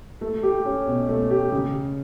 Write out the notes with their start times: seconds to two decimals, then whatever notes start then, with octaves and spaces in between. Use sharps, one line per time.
0.21 A3
0.43 G4
0.65 C#4
0.87 B2
1.09 A3
1.31 G4
1.52 C#3